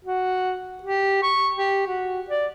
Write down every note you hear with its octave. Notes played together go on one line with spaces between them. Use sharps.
F#4
G4
C#6
G4
F#4
D5